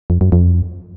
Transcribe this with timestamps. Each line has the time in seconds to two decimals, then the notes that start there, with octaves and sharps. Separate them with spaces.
0.10 F2
0.21 F#2
0.32 F2